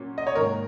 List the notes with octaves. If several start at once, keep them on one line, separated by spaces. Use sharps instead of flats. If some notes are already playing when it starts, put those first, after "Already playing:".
Already playing: A#2 F#3 C#4
D#5
C#5
G#2 D#3 A#3 A#4